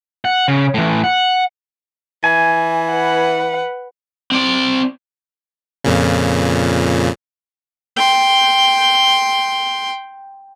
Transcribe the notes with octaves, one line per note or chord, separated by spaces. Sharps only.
F#5
C#3
A2 E3
F#5
E3 G#5
B4 F#5
C4 D5
F2 A#2 C#3
G5 C6